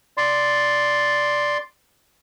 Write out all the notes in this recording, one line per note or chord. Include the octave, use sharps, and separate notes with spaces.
D5 C6